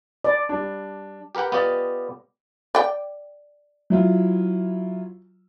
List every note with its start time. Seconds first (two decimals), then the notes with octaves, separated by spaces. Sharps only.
0.24 D5
0.49 G3 D4
1.35 G4 A#4 B4 F#5 G5
1.52 B3 F4 G4 D5 D#5
2.75 D5 G5
3.90 F#3 E4 F4